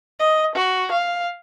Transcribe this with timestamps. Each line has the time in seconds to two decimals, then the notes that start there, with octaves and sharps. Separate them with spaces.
0.20 D#5
0.56 F#4
0.92 F5